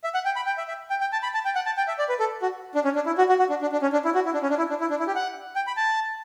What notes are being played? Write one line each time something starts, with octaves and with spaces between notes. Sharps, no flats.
E5
F#5
G5
B5
G5
E5
E5
G5
G5
A5
B5
A5
G5
F#5
A5
G5
E5
D5
B4
A4
F#4
D4
C#4
D4
E4
F#4
F#4
F#4
D4
D4
D4
C#4
D4
E4
F#4
E4
D4
C#4
D4
E4
D4
E4
D4
E4
G4
F#5
G5
B5
A5